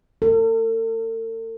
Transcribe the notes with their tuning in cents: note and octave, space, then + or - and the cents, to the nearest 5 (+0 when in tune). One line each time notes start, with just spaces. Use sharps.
A4 +45